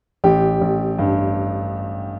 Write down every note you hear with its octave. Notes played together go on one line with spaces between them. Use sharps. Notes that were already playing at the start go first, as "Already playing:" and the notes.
A1 G4
A1
G2